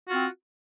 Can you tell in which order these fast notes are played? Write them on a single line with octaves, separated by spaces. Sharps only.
F#4 F4 C4